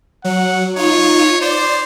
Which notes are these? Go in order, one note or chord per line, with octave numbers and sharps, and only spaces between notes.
F#3 F#5
D#4 F4 C#5
C5 D5